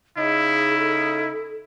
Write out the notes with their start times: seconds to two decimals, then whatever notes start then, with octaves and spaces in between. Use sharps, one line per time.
0.17 C#3 D#4 E4 G#4
0.78 A4